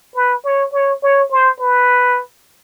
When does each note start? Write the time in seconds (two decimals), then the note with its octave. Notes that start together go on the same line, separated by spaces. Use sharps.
0.15 B4
0.44 C#5
0.73 C#5
1.03 C#5
1.31 C5
1.60 B4